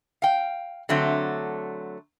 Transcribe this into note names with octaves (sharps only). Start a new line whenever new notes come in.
F5 G5
D3 F#3 A3 C4